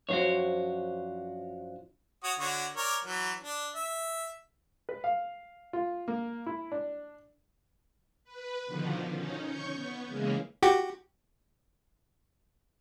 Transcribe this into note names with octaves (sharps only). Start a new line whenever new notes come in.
F#2 F3 D4 F#4 C5 C#5
F#4 C#5 D#6
D3 F#4 C#5
A#4 C#5 D5
E3 F#3
D4
E5
B4
F5
F4
A#3
E4
D4
B4
B2 D3 D#3 F3
C#4 D#4
C#5 C#6 G6
B3
C#3 E3 G#3 A#3 C#4
F#4 G4